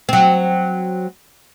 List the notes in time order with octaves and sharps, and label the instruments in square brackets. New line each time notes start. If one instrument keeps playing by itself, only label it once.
[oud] F#3 C4